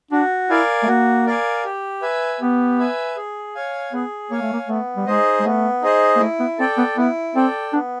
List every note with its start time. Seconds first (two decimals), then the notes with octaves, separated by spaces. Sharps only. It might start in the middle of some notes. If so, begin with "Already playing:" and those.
0.11 D4 F#4
0.50 E4 A#4 D5 F5 G#5
0.83 A3
0.87 A#3 F#4
1.27 A#4 D5 F5 G#5
1.65 G4
2.02 B4 E5 G#5
2.41 B3 G4
2.78 B4 E5 G#5
3.16 G#4
3.55 C#5 F5 G#5
3.93 B3 G#4
4.31 A#3 C#5 F5 G#5
4.42 A3
4.53 A#3
4.68 A3 B3
4.97 G3
5.06 G#3 D#4 G#4 C5 D#5
5.40 G#3
5.45 A3 B3
5.82 D#4 G#4 C5 D#5
6.16 A#3
6.20 A3 E4
6.40 B3
6.58 C4 A4 D5 G5
6.78 B3
6.97 B3 E4
7.35 C4 A4 D5 G5
7.73 B3 D4